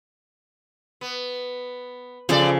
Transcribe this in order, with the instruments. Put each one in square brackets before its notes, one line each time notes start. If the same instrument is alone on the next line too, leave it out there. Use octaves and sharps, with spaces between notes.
[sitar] B3
[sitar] E2 D5 [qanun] C#3 F3 A4